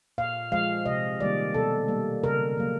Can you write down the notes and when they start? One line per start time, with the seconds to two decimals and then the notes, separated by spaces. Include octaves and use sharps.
0.18 A#2 F5
0.52 F3 G#3 F5
0.86 C3 D#5
1.20 D#3 G3 A#3 D5
1.54 B2 A4
1.88 G3 A#3
2.23 C#3 A#4
2.58 F#3 A#3